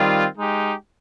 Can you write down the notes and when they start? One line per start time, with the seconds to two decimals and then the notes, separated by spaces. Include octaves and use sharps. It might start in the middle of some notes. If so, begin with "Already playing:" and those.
Already playing: D#3 G3 C4 F4
0.35 G#3 D#4 G4